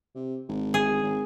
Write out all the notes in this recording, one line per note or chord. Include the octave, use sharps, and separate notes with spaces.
C3
G#1
G#4
G#1